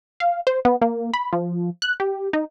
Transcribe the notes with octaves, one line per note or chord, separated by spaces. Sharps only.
F5
C5
B3
A#3
B5
F3
F#6
G4
D#4